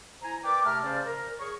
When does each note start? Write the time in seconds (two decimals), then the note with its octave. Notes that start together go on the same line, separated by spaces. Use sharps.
0.21 E4 C5 G#5 A#5
0.44 A#4 B4 D5 G5 D6
0.65 C3 A3 E5 A5 A#5 F6
0.83 C#3 C#4 C5 D5
1.06 A#4
1.40 G#4 C#5 C#6